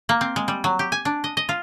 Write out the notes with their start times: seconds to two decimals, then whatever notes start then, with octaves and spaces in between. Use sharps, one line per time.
0.09 A#3
0.21 C4
0.36 G#3
0.48 G3
0.64 F#3
0.79 G4
0.92 G#5
1.05 D4
1.24 D#5
1.37 D#5
1.49 F4